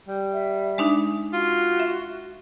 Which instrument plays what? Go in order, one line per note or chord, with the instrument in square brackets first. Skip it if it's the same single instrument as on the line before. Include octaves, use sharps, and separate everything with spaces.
[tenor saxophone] G3
[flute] E5
[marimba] G#3 D4 D#4
[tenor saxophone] F4 [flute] F#4
[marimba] E5